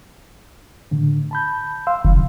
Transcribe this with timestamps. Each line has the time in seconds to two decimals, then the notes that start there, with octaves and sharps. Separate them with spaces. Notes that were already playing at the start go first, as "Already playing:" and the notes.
0.91 A2 D3
1.31 A5 B5 G6
1.87 F5 C6 E6
2.05 F1 D3 F3